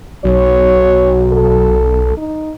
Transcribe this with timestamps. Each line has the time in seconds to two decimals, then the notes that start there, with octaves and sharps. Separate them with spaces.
0.25 B1 F#3 C#5
1.33 A4
2.17 D#4